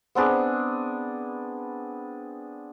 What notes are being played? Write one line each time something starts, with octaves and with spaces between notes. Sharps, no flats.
B3 C4 D4 G#4